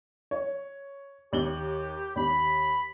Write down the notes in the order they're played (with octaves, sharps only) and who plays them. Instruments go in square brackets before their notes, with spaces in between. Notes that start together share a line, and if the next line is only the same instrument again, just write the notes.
[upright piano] C#5
[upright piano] D#2 F#7 G7 [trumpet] G4
[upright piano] D#2 [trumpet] B5